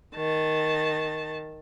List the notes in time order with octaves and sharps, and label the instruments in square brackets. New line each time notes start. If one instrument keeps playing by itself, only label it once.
[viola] D#3 A5